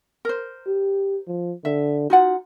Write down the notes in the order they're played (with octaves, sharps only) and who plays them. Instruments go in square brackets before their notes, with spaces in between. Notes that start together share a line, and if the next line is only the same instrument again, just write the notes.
[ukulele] A#4 C5
[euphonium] G4
F3
[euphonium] D3 [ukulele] E5
[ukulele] D#4 F4 F#5 [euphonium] F#4